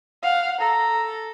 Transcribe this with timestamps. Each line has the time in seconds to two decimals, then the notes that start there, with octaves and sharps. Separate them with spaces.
0.23 F5 F#5
0.60 A4 A#5